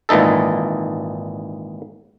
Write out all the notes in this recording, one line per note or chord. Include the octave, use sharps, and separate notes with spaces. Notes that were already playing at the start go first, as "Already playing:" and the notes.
G#1 A#2 E3 D#4 A4